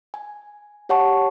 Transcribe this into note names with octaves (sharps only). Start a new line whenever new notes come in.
G#5
G4 C#5 F#5 A5 C#6